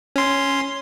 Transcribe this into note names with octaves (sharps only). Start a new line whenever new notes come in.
C#4 C6